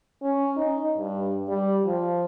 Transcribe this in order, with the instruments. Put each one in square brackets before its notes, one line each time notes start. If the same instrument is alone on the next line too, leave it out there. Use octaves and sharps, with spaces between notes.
[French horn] C#4
D#4
G2
G3
F3